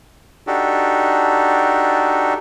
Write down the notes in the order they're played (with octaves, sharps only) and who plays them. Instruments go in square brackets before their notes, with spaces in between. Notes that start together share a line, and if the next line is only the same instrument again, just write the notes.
[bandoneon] D4 D#4 F#4 G4 A4